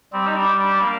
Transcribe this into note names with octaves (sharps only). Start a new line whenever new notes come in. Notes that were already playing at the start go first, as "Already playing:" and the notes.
G3 C4
D#4
D4
D4
A#3